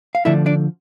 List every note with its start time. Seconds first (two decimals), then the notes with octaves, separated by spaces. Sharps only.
0.15 F5
0.25 D3 F3 A3 D4 E4 E5
0.46 D4 D5